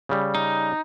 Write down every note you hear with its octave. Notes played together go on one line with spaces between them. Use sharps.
C#3 G3
D#4